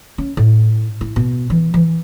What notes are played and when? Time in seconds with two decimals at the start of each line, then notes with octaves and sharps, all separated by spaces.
0.18 C#4
0.37 A2
1.01 E4
1.16 B2
1.50 E3
1.74 E3